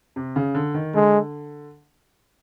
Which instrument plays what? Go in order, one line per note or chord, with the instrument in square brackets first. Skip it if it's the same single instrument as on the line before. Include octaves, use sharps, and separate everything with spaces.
[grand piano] C3
C#3
D3
D#3
[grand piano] D3 [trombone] G#3